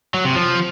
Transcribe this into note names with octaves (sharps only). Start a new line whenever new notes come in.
F#3
C3
F3